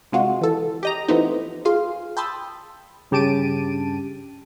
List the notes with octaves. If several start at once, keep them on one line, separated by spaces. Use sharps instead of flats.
C3 G#3 F4 F#4
E3 A4
G4 D#5 A#5
E3 F3 A3 B3 C4 D#4
F4 G#4 F5 C6
G5 A5 B5 C6 D#6 E6
G2 C#3 G4 A5 D7 D#7